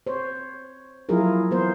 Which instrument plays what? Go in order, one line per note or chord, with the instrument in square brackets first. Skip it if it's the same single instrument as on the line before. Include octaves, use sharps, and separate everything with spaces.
[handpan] C5 C#5
F3 F#3 E4 F4 G#4 A#4
E3 B3 A#4 C5